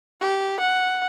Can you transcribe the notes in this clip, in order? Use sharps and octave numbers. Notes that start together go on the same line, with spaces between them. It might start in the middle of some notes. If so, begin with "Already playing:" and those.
G4
F#5